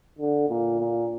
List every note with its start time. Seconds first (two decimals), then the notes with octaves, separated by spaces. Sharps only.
0.18 D3
0.49 A#2
0.80 A#2